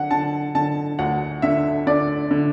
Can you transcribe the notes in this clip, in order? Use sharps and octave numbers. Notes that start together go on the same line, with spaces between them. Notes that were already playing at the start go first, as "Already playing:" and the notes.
Already playing: D3 F#5
D3 A5
D3 A5
D2 F#5
D3 E5
D3 D5
D3